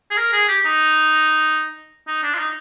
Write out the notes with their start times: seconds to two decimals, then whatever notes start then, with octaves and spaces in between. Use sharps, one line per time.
0.11 G#4
0.17 A#4
0.33 G#4
0.49 G4
0.66 D#4
2.07 D#4
2.24 D4
2.35 F4
2.39 D#4